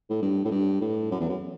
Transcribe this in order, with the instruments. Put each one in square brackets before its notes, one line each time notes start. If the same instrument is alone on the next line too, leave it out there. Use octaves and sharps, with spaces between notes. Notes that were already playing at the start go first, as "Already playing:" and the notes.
[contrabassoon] A2
G2
A2
G2
A2
F#2
E2
F#2